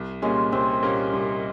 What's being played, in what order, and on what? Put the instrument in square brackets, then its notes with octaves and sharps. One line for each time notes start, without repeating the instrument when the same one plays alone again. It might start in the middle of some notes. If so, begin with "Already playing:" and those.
Already playing: [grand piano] C2
[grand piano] A#2 G3 A#3 C#4 [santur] G#3
[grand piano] C2 [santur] C4
[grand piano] A#2 G3 A#3 C#4
C2